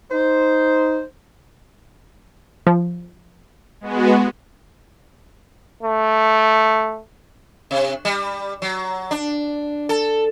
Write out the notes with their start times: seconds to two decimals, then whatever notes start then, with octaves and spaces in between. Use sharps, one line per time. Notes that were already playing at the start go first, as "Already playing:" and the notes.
0.10 D#4 C5
2.67 F3
3.81 G#3 B3 F#4
5.83 A3
7.71 C3
8.05 G3
8.62 F#3
9.11 D4
9.89 A4